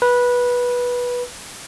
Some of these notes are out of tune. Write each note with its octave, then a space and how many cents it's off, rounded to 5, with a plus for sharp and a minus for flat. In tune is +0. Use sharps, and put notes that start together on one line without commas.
B4 -15